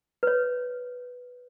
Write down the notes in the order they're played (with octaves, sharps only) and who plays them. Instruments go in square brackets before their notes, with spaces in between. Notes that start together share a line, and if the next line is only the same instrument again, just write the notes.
[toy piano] B4 C#5